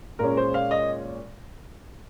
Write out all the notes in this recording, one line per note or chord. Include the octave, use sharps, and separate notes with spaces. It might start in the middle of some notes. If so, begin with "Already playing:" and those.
A#2 G#3 C#4 A#4
C5
F5
D#5